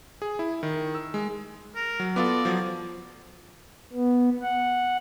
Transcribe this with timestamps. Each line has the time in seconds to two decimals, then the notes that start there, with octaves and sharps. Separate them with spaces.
0.22 G#4
0.39 E4
0.63 D#3
0.95 E6
1.14 G#3
1.75 A#4
2.00 F#3
2.16 B3 F4 A4 D5
2.45 F3 F#3
3.93 B3
4.42 F#5